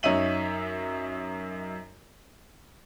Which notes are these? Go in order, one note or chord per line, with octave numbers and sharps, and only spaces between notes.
F#2 D#4 C#5 E5 D#7 F#7